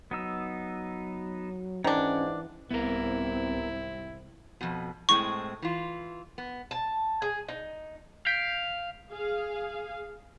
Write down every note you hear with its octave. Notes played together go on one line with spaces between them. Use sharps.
F#3 B3 D#4 E6
G#2 D#3 E3 C#4 D4
C2 G#2 B3 C4 E4 A#4
F2 B2
A2 G#3 C4 C#6
E3 F4
B3
A5
G#4
D#4
F5 G6 B6 D7
G#4 F5